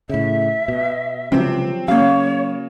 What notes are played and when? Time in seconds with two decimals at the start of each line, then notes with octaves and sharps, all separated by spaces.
0.09 A2 C#3 E5
0.68 B2
1.32 C#2 C3 F3 F#3 C4
1.88 C#3 F#3 A#3 C#5 F5